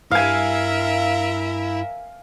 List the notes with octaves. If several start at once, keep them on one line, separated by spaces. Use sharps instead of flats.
G2 D4 E4 A#4 E5 F5 G#5